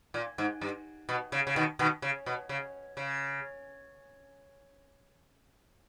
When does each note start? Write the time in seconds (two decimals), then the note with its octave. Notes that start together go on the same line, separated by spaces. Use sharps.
0.14 A#2
0.38 G#2
0.61 G2
1.09 B2
1.32 C#3
1.47 C#3
1.56 B2 D#3
1.79 B2 D#3
2.02 C#3
2.26 B2
2.49 C#3
2.97 C#3